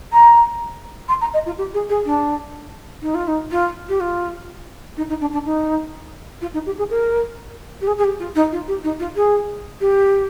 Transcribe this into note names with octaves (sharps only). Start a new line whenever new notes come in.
A#5
C6
A#5
D#5
F4
G4
G#4
G#4
D4
D#4
F4
D#4
F4
G4
F4
D#4
D#4
D4
D4
D#4
F4
D#4
G4
G#4
A#4
G4
G#4
G#4
G4
F4
D#4
F4
G4
D#4
F4
G#4
G4